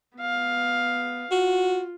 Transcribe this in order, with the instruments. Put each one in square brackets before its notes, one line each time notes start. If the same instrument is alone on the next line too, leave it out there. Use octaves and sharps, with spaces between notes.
[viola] B3 F5
[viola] F4 [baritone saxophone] F#4